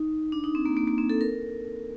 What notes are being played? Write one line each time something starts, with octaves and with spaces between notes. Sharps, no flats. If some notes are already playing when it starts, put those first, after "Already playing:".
Already playing: D#4
D4
D#4
C4
A#3
A#3
A#3
C4
A4
A#4